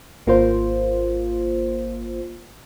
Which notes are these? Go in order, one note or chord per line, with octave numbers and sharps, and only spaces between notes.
G#1 A#3 F4 C5